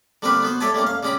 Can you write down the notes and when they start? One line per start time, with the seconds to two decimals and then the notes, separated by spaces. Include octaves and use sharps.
0.22 D3 G3 A#3 C4 A#4 B4
0.43 B3 F#4 C5
0.60 A4 C#5 D5 E5 G#5 A5
0.74 G3 A3 A#3 C#4
0.87 F5
1.03 C#3 G3 C#4 A#5 B5 D6